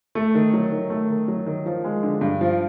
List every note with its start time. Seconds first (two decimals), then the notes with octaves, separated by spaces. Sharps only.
0.15 A3
0.35 D#3
0.53 F#3
0.72 D#3
0.90 A3
1.10 D#3
1.28 F#3
1.46 D#3
1.66 F3
1.84 G#3
2.03 D3
2.21 G2
2.41 F3